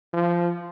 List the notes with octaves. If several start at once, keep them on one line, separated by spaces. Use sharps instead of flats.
F3